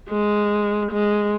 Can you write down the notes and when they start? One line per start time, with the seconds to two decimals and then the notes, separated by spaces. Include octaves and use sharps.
0.09 G#3
0.92 G#3